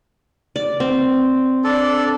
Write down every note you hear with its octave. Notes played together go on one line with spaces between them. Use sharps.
D5
C4
D4 A4 D5